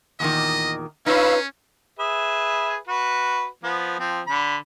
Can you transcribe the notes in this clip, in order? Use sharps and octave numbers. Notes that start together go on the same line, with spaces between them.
E2 A#2 D#3 D#5
C#4 D#4 F4 B4 C#5 F5 B5 E6
G#4 B4 E5
F#4 B4
F3 B3
F3 C4
D3 B5